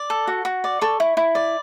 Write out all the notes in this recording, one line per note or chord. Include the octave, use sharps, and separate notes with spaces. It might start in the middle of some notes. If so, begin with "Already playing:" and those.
Already playing: D5
A4
F#4
F#4
D5
A4 C#6
E4
E4
D5